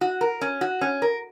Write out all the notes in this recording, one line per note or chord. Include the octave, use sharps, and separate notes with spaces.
F#4
A#4
C#4
F#4
C#4
A#4